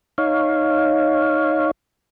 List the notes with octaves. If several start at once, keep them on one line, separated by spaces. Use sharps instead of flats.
D#4 C#5 F5